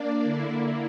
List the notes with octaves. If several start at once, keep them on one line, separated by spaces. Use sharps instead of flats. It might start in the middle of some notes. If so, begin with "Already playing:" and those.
Already playing: A#3 D4 D5
D3 A#3 E4